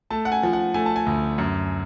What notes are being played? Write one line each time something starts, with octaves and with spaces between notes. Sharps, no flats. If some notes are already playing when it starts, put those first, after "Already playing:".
A3 A5
F#5
G#5
F3
F#5
A3 G#5
A5
G#5
D2
F#2